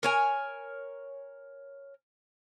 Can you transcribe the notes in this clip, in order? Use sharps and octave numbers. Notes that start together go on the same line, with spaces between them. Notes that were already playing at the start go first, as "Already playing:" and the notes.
A#4 C#5 G#5